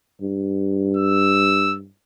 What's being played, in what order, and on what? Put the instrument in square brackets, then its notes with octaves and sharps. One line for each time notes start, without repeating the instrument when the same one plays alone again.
[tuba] G2
[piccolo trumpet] E6